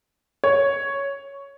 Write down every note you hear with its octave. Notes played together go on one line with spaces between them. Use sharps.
C#5